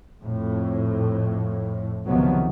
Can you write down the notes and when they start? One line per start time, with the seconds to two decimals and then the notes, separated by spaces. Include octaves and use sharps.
0.21 F2 A2
2.06 C#2 C3 D#3 F3 F#3 B3